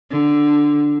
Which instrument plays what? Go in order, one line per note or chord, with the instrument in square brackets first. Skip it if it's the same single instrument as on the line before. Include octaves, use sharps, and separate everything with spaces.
[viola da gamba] D3